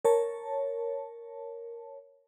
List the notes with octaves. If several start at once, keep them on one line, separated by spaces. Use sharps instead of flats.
A#4 C#5 A5